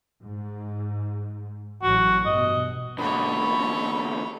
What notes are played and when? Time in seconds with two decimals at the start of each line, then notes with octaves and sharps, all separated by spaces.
0.22 G#2
1.83 A1 F#3 F#4
2.26 G2 B2 D#5
2.98 E2 D3 A4 C#5 B5